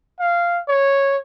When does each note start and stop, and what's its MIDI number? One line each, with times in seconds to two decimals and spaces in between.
0.20 0.60 77
0.68 1.17 73